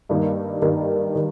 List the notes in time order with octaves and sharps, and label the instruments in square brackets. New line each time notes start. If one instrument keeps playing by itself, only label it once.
[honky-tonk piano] G2 D#3 G3 A#3 D#4
G2 D#3 G3 A#3 D#4
D#3